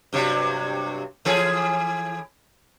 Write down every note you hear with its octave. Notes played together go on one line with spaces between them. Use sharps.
G2 C3 F#3
E3 G#4 A4